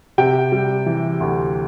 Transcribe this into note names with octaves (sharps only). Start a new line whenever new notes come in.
C3 G5
G3
E3
D2